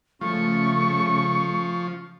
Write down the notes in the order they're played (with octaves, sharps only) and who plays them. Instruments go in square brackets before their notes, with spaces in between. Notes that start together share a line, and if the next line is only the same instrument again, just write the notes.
[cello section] C#3 A3 [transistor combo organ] F3 [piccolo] C#6